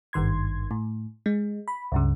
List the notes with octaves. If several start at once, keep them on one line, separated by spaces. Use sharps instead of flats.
G#1 G2 D#3 C6 G#6
A2
G#3
B5
C#2 G2 C#3